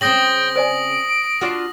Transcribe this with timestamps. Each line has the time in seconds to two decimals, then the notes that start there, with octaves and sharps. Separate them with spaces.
0.01 C#3 C4 G5 D#6 A#6 F#7
0.56 C5 D5 G#5 D7
1.41 D4 F4 F#4